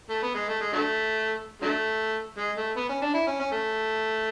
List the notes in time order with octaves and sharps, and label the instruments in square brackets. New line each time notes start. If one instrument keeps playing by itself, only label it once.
[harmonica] A3
B3
G#3
A3
G#3
D3 F#3 A3
D3 F#3 A3
G#3
A3
B3
C#4
D4
E4
C#4
C#4
A3